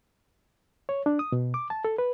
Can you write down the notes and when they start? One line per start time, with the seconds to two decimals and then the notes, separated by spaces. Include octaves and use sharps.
0.89 C#5
1.06 D4
1.19 D#6
1.32 B2
1.54 D6
1.70 A5
1.85 A4
1.98 B4